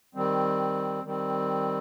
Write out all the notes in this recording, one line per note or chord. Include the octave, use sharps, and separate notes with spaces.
D#3 G3 C4
D#3 G3 C4